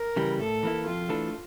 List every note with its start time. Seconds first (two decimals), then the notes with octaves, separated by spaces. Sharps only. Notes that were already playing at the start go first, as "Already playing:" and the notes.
Already playing: A#4
0.16 C#3 E3 G3
0.39 A2 A4
0.63 E3 A#3 E4
0.86 F2 F4
1.09 E3 A3 D4 A4